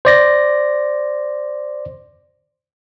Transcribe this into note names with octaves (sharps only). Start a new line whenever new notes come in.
C5 D5 A#6